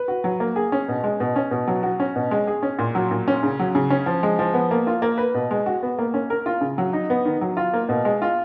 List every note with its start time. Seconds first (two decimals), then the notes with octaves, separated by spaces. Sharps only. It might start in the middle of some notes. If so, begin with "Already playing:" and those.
Already playing: B4
0.08 F#4
0.24 F#3
0.40 A#3
0.56 G#4
0.72 C#4
0.88 B2
1.04 G#3
1.20 B2
1.36 C#4
1.51 B2
1.67 F#3
1.83 F#4
2.00 C#4
2.16 B2
2.31 G#3
2.47 G#4
2.63 C#4
2.79 A#2
2.95 F#3
3.11 A#2
3.28 C#4
3.43 C#3
3.59 F#3
3.75 C#3
3.90 C#4
4.06 F3
4.23 G#3
4.39 F3
4.54 B3
4.71 A#3
4.87 F4
5.02 A#3
5.18 B4
5.34 B2
5.51 G#3
5.66 F#4
5.83 B3
5.99 A#3
6.14 C#4
6.30 A#4
6.46 F4
6.61 C#3
6.78 F#3
6.93 D#4
7.10 B3
7.25 D#3
7.41 F#3
7.57 F4
7.73 A#3
7.89 B2
8.05 G#3
8.22 F4